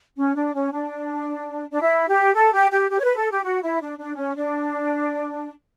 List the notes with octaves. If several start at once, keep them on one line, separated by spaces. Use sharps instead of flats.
C#4
D4
C#4
D4
D4
E4
G4
A4
G4
G4
G4
C#5
B4
A4
G4
F#4
E4
D4
D4
C#4
D4